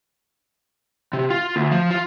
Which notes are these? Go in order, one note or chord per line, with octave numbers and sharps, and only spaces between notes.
C3
F4
D2
F3
F4